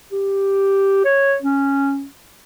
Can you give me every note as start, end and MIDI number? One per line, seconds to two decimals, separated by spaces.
0.12 1.04 67
1.05 1.36 73
1.42 2.06 61